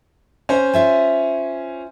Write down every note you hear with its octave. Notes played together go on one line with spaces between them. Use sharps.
C#4 C5
F4 E5 G#5